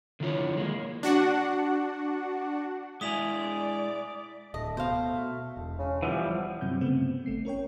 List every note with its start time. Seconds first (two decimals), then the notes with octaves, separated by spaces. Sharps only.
0.20 D3 D#3 F3 E4 F4 C#5
0.57 G#3 A#3
1.03 D4 F#4 F#5
3.01 G#3 E4 G#4 D5 D#6 B6 F7
4.54 D1 A3 D#5
4.77 B2 C5 F5
5.57 E1
5.79 C#3
6.03 E3 F3 G3 B3
6.61 G2 C3 F#3 C4 G6
6.81 C#3 A3 B3 C4
7.26 G#1 A3 C7
7.45 C#4 A#4 C#5 G5